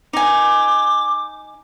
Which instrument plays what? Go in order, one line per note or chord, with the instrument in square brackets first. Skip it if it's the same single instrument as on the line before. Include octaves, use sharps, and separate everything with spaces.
[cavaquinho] D#4 G#5 [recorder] D6